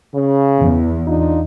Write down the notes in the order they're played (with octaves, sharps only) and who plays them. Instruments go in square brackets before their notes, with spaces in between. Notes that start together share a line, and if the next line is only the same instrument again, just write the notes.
[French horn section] C#3
[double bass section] E2
[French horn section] D4 D#4 F4